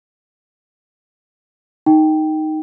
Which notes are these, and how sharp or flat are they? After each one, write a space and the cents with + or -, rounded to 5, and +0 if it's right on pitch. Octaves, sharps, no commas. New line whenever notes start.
D#4 +0 G5 +0